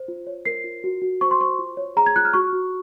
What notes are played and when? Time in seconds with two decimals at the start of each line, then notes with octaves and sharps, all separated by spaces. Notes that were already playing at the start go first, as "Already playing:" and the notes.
Already playing: C5
0.08 F4
0.27 C#5
0.45 A#4 C7
0.64 F4
0.84 F#4
1.02 F#4
1.21 C5 C#6
1.31 C6
1.40 C5 C#6
1.59 F4
1.77 C#5
1.96 G#4 A#5
2.06 G#6
2.16 F4 F#6
2.25 F6
2.33 F#4 C#6
2.53 F#4